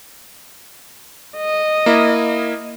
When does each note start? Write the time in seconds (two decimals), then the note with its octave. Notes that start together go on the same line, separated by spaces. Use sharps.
1.37 D#5
1.86 A#3 E4